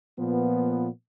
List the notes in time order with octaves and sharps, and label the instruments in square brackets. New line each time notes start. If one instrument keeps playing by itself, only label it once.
[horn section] A#2 F3 B3